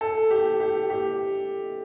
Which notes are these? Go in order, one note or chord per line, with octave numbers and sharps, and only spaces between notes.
A4
G4
G4
G4